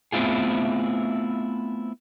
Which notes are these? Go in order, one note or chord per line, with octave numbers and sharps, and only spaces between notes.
A3 B3 C4 E4 F4 G#4